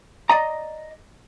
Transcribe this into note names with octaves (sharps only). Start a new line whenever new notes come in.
D5 D#5 A#5